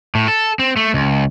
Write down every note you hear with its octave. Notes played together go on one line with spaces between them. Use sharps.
A2
A4
C4
A3
C#2